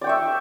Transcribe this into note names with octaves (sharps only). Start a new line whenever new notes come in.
D5 E5 G5 C#6